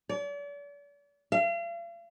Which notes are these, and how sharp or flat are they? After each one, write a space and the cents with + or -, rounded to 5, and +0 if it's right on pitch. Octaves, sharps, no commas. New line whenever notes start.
D5 -40
F5 -40